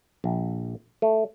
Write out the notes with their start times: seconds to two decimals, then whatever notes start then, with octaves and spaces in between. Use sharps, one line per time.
0.24 A#1
1.02 A3